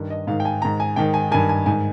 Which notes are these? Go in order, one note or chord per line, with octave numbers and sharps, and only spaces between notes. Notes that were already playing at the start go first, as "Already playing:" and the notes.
Already playing: G2 D#3
D#5
G#2 D#3 F5
G5
G#5
G#2 D#3 A#5
G#5
G#2 D#3 G5
G#5
G2 D#3 G#5
G#5
G#2 D#3 G#5